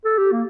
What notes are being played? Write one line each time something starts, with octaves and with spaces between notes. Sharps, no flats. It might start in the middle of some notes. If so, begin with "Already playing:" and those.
A4
G4
A#3